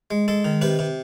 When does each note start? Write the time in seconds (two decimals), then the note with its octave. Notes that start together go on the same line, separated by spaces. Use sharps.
0.11 G#3
0.28 G#3 A4
0.45 D#3
0.61 C3 B4
0.79 C3